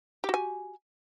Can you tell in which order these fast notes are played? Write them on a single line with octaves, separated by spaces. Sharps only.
G4 F#4 G#5